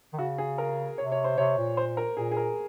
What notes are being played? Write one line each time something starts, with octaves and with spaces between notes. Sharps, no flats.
D#3
C#3 F#4
G#4
A#4
C3 C#5
C#5
C5
C3 C#5
A#2
C5
A#4
A#2 G#4
G#4
A#4